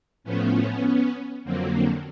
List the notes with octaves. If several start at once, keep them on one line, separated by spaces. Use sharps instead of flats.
A2 F3 A3 B3 C#4
F2 D3 F#3 A#3 C4